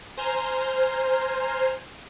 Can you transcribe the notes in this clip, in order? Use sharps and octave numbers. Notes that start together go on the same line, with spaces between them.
C5 G#5 A#5 C6 F6 G6